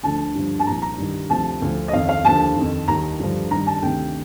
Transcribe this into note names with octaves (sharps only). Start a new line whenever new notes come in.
D2 D3 F3 A5
G2 D3 F3
A5
C2 A#2 F3 A#5
A#5
G2 D#3
D2 C3 F3 A5
D2 D3 F3
D#5
F2 D#3 F5
F5
D#2 D3 F3 A5
F2 D#3
D#2 D#3 A#5
G2 D3 F3
G2 D#3 A#5
A5
D2 C3 D#3 G5